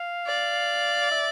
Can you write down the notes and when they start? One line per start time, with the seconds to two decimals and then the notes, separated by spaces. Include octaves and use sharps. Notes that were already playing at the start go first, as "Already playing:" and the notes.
Already playing: F5
0.27 D5
1.11 E5